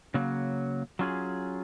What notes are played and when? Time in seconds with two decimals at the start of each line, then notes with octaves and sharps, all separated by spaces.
0.14 C#3 F#3 A#3
0.99 F#3 C#4 F4 G#4